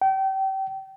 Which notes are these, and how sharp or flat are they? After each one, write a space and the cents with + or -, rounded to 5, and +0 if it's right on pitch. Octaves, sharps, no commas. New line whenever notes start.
G5 -30